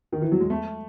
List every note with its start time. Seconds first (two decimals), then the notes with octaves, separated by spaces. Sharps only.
0.12 D#3
0.22 E3
0.32 F#3
0.40 G#3
0.50 A3